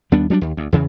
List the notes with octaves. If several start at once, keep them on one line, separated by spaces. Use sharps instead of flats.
D#2 G3 B3 D4
F#3 G3 C#4 D4
D#2
D2
E2 C#3 E3